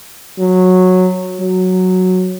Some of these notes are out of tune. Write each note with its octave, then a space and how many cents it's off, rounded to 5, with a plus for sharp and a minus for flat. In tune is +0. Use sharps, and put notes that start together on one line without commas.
F#3 -10
F#3 -5